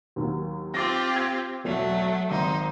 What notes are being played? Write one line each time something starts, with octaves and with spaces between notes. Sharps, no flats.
D#2 D#3 F#3
C4 F4 G4 D6 A6 A#6
G#6
E1 B1 F#3 A3 F7
G#1 D#4 C5